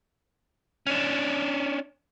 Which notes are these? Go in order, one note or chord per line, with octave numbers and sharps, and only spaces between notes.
C#4 D4